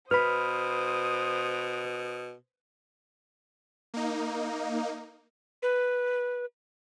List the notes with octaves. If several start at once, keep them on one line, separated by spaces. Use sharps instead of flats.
B2 B4 C5 B5 D#6 F6
A#3 D#4
B4